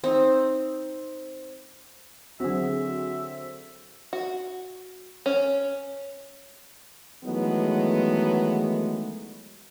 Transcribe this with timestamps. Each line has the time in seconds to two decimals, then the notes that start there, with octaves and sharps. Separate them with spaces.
0.04 C4 D#4
2.40 D3 F#3 C4 F#4 G#4 E5
4.13 F#4
5.26 C#4
7.24 D#3 E3 F#3 G#3 A3 B3